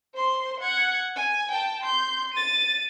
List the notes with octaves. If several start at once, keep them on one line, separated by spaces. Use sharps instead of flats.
C5 C6
F#5 G#6
G#5
G5 A5
C6 G6
A6 D#7